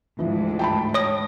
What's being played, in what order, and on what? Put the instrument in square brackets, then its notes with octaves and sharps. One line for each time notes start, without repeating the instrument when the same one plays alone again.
[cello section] D2 G#2 [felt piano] E3 F3
[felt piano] G5 A5 B5
[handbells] C#5 D#6 [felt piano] A#6